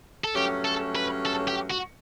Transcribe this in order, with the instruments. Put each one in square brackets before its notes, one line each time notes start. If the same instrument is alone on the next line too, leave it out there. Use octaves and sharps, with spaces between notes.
[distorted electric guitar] A4
[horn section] G2 F#3 A3 C#4 [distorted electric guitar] G4
[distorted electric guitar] A4
B4
A4
G4
F#4